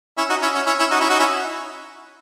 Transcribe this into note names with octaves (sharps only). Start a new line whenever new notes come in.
C#4 E4
D#4 F#4
C#4 E4
C#4
C#4 E4
C#4 E4
D#4 F#4
C#4 E4
D#4 F#4
C#4 E4